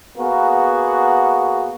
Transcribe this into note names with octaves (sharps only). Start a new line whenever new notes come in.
A#3 B3 F#4 G#4